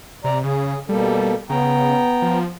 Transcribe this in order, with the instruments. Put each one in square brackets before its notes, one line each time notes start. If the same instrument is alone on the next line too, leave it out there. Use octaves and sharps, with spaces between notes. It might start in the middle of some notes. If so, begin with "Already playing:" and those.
[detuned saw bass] C3 [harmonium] D5 A#5
[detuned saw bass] C#3 [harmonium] G#4
[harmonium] B2 A#3 A4 [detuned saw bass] G3
[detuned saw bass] C#3 [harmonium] B3 G5 A#5
[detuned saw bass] F3